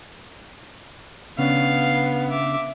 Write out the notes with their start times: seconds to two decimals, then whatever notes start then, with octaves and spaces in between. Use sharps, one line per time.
1.38 C#3 B3 C#4 D4 F5
2.30 E5 D6